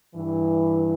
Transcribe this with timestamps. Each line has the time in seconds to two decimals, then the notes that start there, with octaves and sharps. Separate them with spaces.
0.15 G2 E3